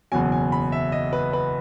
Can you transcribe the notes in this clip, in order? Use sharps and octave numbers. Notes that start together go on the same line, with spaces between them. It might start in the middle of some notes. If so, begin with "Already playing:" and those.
F#1 E2 B2 F#3 G#5
G#5
B5
E5
D#5
B4
B4